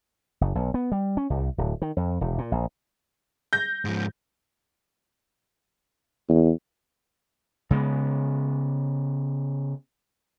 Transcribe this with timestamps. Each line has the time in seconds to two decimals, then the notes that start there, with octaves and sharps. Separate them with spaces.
0.41 F#1
0.55 B1
0.74 B3
0.92 G3
1.17 C#4
1.30 C2
1.58 D1
1.82 D#3
1.97 F2
2.21 E1
2.38 A#2
2.52 A#1
3.53 G6 A#6
3.85 G#2 F3
6.29 E2
7.71 C#3 G#3 A#3 B3